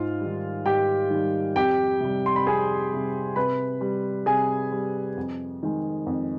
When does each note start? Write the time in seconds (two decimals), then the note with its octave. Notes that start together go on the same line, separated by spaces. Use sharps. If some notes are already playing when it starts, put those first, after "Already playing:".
Already playing: G#2 F4 F5
0.20 G3
0.25 D#3
0.66 G#2 G4 G5
1.10 D#3 G3
1.56 F2 G4 G5
2.00 C3 G3
2.26 C6
2.36 B5
2.46 F2 G#4 G#5
2.91 C3 G3
3.36 C3 B4 B5
3.81 G3
4.26 C3 G#4 G#5
4.72 G3
5.17 F2
5.63 D#3 G#3
6.07 F2